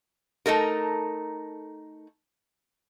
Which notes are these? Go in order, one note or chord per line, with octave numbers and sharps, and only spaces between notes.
A3 D#4 A4 A#4